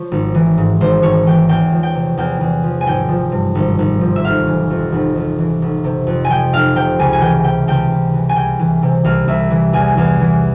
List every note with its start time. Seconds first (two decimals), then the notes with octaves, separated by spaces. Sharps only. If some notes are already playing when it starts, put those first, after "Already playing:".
Already playing: F3 C#5
0.12 G#1
0.35 E3
0.58 G#2
0.80 G#1 C5
1.02 G#1 C#5
1.26 E3 G5
1.48 E2 G5
1.72 F3
1.83 G5
1.95 C3
2.17 E2 G5
2.41 E2
2.63 F3
2.81 G#5
2.86 G#1 G5
3.09 F3
3.32 G2
3.55 G#1
3.79 G#1
4.01 F3
4.16 E5
4.24 F1 F5
4.47 E3
4.70 F2
4.92 F1
5.16 F1
5.38 E3
5.62 F1
5.84 C3
6.07 F2
6.25 G#5
6.30 F3 G5
6.53 F1 F5
6.76 C3 G5
6.99 C#2 G#5
7.13 G#5
7.21 E3 G5
7.44 C3 G5
7.67 C#2 G5
7.90 C#2
8.14 E3
8.29 G#5
8.36 C2 G5
8.59 E3
8.83 C3
9.04 C2 F5
9.28 C2 E5
9.51 E3
9.73 E2 G#5
9.97 E2
10.20 E3